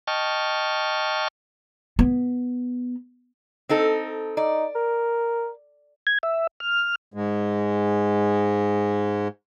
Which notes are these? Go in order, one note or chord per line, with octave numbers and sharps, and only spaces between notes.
D#5 G5 A5 C#6 F6
B3
C4 D#4 A4
D#4 D5
A#4
G#6
E5
F6
G#2 G#3